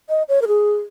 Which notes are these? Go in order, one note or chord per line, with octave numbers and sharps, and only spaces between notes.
D#5
C#5
A#4
G#4